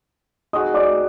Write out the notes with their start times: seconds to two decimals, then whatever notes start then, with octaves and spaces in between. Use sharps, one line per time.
0.53 G#3 C4 D#4 F#4 D#5 D#6
0.74 D5 D6